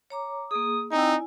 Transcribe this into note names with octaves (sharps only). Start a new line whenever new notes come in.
C#5 A#5 D6
A#3 G#4 D#6
C4 D#4 E4 D5 G#5